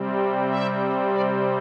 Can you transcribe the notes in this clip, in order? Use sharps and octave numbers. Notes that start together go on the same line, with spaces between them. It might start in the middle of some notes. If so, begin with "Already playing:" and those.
Already playing: C3 G3 C4
E5
D5